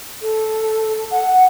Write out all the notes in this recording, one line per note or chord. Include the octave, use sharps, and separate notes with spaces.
A4
F#5